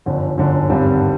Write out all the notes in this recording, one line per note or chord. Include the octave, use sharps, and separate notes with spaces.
G1 F#2 D3 F3
G1 F#2 D3 F3
G#1 G2 D3 G3 C4